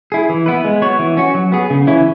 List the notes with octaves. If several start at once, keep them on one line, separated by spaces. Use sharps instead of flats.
E4 G#4
E3
B3 E4 B4
G#3
B3 F#4 C#5
E3
C#4 F#4
F#3
B3 G#4
C#3
E3 C#4 E4